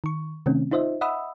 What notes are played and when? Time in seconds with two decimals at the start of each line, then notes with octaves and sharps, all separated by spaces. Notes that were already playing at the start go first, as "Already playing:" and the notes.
0.04 D#3 C#6
0.46 C3 D#3 A3 C4 C#4
0.71 D#4 F4 C5 D#5 E5
1.01 D#5 E5 F#5 B5 D#6 E6